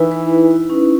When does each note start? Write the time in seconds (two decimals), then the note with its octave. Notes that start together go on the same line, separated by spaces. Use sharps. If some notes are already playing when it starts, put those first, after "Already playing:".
Already playing: E3 D#4 E4 B4
0.12 B4
0.31 E4
0.51 E4
0.70 C#4